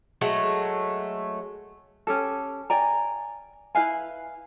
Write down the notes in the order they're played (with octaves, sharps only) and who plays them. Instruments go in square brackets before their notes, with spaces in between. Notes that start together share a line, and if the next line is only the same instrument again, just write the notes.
[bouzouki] F#3 G#3 A3
[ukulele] C#4 G4 A4
D5 G5 G#5 A#5
E4 B4 F5 G#5